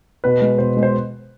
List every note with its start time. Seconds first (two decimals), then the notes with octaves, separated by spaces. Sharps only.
0.24 B2 B4
0.42 G#3
0.58 B2 C5
0.77 G#3
0.83 C5